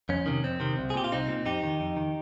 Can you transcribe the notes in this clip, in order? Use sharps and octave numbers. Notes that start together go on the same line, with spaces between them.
F2 C#4
C3 D#3
F2 C4
C3 D#3
C2
G#4
A#2 G4
F4
C2 C4 D#4
A#2
F2 D#4 G4
D#3
F2
D#3